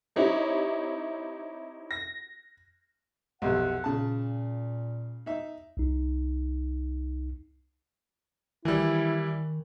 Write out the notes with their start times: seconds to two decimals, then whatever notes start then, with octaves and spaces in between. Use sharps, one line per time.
0.16 C4 D#4 E4 G4 C#5
1.91 A#6
3.42 B1 F2 C3 F#5
3.84 A#2 C#3 A5
5.26 D#4 E5
5.77 C2 D#4
8.65 D#3 E3 G3 E4